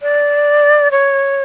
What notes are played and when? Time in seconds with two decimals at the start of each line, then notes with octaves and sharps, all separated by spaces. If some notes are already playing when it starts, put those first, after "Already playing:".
0.02 D5
0.91 C#5